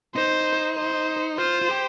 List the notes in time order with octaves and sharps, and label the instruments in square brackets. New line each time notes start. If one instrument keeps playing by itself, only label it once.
[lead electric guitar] D#4 [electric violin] C5
[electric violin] C5
[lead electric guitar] F4 [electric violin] C5
[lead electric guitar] F4
G4